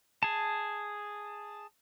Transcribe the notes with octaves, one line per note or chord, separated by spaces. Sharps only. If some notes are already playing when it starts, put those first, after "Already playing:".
G#4 A5